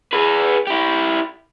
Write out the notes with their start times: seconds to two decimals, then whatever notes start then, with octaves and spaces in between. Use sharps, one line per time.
0.13 G#4 B4
0.67 E4 G4